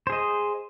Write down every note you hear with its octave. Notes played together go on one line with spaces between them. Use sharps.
G#4 C5 D#5